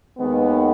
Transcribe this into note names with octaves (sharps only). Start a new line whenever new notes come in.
D#2 D#3 G#3 B3